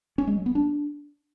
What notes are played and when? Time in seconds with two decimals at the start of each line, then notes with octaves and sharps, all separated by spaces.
0.18 C#4
0.27 G#3
0.37 F#3
0.46 B3
0.55 D4